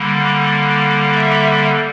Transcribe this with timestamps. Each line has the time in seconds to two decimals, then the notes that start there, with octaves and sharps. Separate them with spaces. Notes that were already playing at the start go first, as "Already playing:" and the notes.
Already playing: D3 G3 A#3
1.15 E5